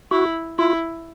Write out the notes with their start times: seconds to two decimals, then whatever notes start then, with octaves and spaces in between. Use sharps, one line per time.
0.11 E4 F#4
0.59 E4 F4